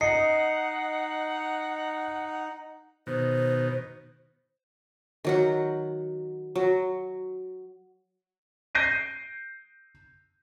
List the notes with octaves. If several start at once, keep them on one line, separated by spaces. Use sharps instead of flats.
D#4 D#5 F#5 C7 C#7
B2 D#3 C5
D#3 F#3 F#5
F#3
G6 A#6 C7 D7 D#7